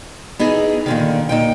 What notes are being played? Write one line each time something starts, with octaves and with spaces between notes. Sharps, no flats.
B3 D#4 E4 G#4
A#2 D3 D#3
A#2 D#4 G5